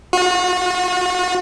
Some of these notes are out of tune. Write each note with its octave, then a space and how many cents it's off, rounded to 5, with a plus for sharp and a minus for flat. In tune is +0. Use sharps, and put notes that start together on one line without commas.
F#4 -40